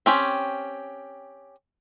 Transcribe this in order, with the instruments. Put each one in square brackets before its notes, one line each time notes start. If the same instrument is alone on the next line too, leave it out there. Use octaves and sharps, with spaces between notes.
[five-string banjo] C4 C#4 G4